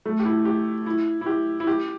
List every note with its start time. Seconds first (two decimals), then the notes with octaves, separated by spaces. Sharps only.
0.06 A3
0.19 G4
0.25 E4
0.45 G4
0.86 E4
1.21 E4
1.26 G4
1.60 E4
1.67 G4